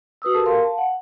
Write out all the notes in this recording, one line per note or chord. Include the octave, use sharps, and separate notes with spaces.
F#4 B4 D#6 E6
G4 A4 A#4 A5
A#4 F5 C6
F5 A5
F#5